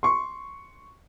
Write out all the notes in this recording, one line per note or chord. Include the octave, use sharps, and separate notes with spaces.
C6 C#6